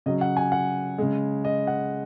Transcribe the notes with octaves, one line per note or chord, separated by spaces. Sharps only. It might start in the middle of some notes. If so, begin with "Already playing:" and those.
C#3 F#3 D#5
F#5
G#5
F#5
C#3 G#3
D#5
F#5